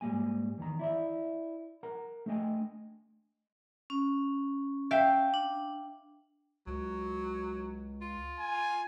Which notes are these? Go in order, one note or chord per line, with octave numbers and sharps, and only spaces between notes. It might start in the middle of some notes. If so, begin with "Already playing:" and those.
G#2 G3 A#3 G#5
E2 D#3 A#5
E4 D5 E5
A#4 F#5 A#5
A3 D4 A4 D#5 G5 G#5
C#4
E5 F5 G5
D4
C#2 F#3
F4
G#5